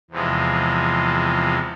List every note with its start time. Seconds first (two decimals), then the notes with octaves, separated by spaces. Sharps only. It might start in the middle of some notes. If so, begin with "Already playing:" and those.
0.11 E2 C3 F3 G#3